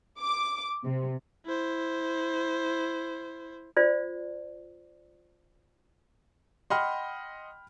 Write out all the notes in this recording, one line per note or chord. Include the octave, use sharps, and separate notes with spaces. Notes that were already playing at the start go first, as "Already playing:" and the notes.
D6
C3
E4 C5
F4 C5 D5
D#5 F#5 G5 B5 C6 F6